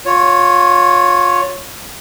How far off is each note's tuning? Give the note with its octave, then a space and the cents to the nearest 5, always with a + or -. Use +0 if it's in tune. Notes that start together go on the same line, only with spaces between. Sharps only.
F4 +25 C#5 +0